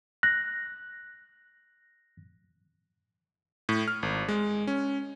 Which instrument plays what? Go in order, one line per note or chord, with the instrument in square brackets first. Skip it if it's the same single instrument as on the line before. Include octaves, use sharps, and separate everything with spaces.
[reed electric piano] F#6 [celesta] A#6
[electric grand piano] A2
F6
G#1
G#3
C#4